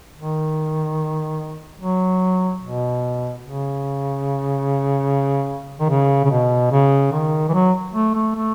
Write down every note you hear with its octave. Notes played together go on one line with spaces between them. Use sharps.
D#3
F#3
B2
C#3
D#3
C#3
C#3
B2
C#3
D#3
E3
F#3
A3
A3
A3